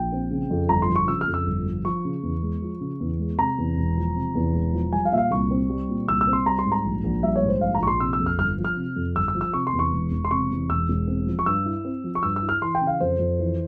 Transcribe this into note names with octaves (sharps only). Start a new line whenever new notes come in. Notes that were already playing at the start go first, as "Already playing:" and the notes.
Already playing: A#1 G5
C4
C#3
F2
G1 A#5
C6
F3
C#6
C#3 E6
F6
F2
E6
G1
F3
F3 C#6
C#3
E2
G#3
F3
C#3
E2
G#3
C3 A#5
E2
E1
F3
C3
E2
E1
F3
G3 G#5
F5
A#2 E5
F5
C2 C#6
C4
G3
A#2
C2 E6
E6
C4
C6
G3 A#5
C6
G#2
A#5
A#1
A#1
G3 E5
C#5
G#2
C5
A#1 F5
A#5
A#1 C#6
C6
C3 E6
E6
F2
F6
G1 F6
F3
F6
C3
F2
G1 E6
E6
F3
E6
C3 C#6
C6
E2
C#6
E1
E1
C6
C3 C#6
E2
E1 E6
E1
C4
F3
C#6
G2 E6
E4
C4
F3
C#6
G2 E6
E6
E4
F6
E3 C6
G5
C#3
F5
F2 C5
F2
E3